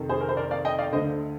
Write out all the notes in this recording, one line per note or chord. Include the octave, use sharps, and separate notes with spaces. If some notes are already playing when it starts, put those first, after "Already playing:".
Already playing: F2 C3 D#3
G#4 C5
A#4
C5
A#4 D5
D5 F5
D#5 G5
D5 F5
D2 D3 C5 D#5